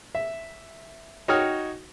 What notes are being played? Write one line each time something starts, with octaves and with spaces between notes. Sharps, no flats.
E5
D#4 F#4 C#5 G5 D#6 F6